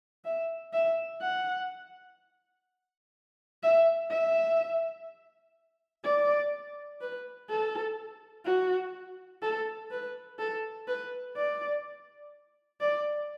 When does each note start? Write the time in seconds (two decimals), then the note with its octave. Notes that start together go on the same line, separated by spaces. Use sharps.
0.25 E5
0.73 E5
1.21 F#5
3.63 E5
4.10 E5
6.04 D5
7.01 B4
7.50 A4
8.45 F#4
9.42 A4
9.91 B4
10.39 A4
10.88 B4
11.36 D5
12.81 D5